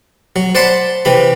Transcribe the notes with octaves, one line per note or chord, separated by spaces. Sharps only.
F#3
C5 D5 F#5 A5 B5 C6
C3 E3 G4 B5